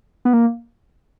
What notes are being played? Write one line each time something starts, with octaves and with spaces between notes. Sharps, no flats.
B3
A#3